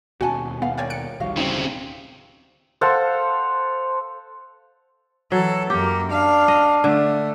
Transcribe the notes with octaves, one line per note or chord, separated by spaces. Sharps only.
D#2 B2 C#4 F#4 F#5 G#5 A5
B3 F5 F#5
A#4 C#5 D5 F5 G5 G#5
F#6 C#7 D7
D1 A#1 D#3 G3 F#4 F5
C#3 C4 C#4 D#4
A4 C5 F5 F#5
E3 F#3 A4
F#2 A#3 G4
D4 F5
D#5
D3 A3